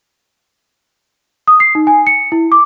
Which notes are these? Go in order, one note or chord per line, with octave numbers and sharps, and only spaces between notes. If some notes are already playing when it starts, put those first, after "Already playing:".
D#6
C7
D#4
G#5
C#7
E4
D6